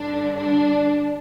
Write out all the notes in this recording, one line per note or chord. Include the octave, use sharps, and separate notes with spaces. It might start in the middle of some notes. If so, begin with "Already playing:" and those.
Already playing: G2 D3 D4
D4